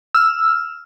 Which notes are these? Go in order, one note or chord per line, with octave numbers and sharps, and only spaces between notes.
E6 F6